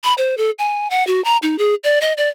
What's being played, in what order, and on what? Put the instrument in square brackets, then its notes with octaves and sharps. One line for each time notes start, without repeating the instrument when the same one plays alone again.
[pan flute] B5
C5
A4
G#5
F#5
F#4
A#5
D#4
G#4
D5
D#5
D5